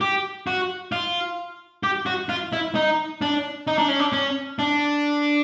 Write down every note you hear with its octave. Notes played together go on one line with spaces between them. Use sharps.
G4
F#4
F4
G4
F#4
F4
E4
D#4
D4
D#4
D4
C#4
D4
C#4
D4